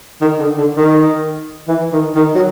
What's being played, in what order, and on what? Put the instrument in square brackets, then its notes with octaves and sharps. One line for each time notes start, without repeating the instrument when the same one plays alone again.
[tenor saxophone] D#3
D3
D3
D#3
E3
D#3
D#3
F#3